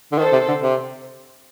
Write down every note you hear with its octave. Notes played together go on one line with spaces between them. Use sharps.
D3
D#3 A4 C5
C3
D3
C3